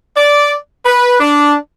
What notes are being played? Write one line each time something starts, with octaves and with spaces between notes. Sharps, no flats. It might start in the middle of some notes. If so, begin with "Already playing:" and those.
D5
B4
D4